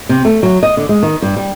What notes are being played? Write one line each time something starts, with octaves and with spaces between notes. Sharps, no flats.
C3
A3
F#3
D#5
D3
G#3
D#3
G2
G3